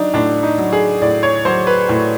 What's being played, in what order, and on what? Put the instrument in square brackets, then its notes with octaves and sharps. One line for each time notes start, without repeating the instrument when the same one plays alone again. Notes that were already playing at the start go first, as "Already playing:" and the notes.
Already playing: [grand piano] F#3 D4 D#4
A2 D4
D#4
F#3
G#4
A2 D5
C#5
F#3 C5
B4
A2